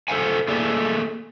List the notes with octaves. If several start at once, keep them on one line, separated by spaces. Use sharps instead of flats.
A4 C5 F5 F#5 G#5
A3 A#3 G#4 A4 D5